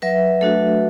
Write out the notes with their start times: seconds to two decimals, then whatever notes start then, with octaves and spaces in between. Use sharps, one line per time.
0.02 F#3 B4 E5
0.41 A3 D4 F#4 A4